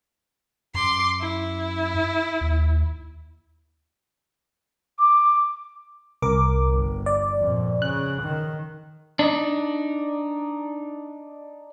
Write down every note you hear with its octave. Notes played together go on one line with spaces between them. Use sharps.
F#2 C6 D6
E4
D#2
D6
C2 A#4 D6
G1
D5
F2 A#2
C#3 F#6
D#3
D4 D#4